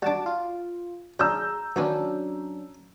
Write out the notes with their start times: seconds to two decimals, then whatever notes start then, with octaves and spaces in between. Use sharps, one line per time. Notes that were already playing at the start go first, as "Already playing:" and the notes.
0.02 G3 D4 F#4 A5 D6
0.26 F4
1.20 F#3 D4 G#4 A#5 E6 G6
1.76 D#3 F#3 A#3 C#4 D4 B4